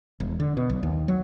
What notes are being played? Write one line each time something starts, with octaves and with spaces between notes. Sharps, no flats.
E1
D3
B2
B1
D#2
F#3